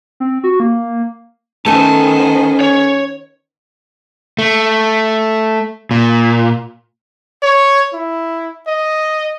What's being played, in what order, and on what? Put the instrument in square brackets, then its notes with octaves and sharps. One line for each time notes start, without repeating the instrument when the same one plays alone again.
[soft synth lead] C4
F#4
A#3
[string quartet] D#3 B3 C5 [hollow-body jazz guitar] A3 A4 [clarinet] C#4 [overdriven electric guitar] G#5 A5
[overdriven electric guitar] C#5
[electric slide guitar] A3
A#2
[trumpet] C#5
E4
D#5